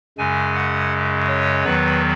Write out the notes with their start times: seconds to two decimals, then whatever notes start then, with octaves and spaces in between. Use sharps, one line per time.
0.18 F#2 C#3 G#3 G#5
0.55 F#5
1.27 C#5
1.64 E2 D#3 F#3 B3 B4